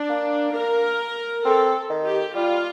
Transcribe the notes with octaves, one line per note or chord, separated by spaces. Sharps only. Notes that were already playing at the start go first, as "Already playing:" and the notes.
Already playing: D4
A#3
A#4
C4 A4
D#3
G4
G3 F4